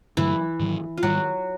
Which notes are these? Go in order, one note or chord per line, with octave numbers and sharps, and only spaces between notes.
G2 D3 E3 F#3 A3 E4
G#2 D#3 F#3
F4
G#2 D#3 F#3 G3 F#4